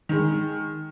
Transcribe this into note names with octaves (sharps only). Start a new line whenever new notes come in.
D#3 G#3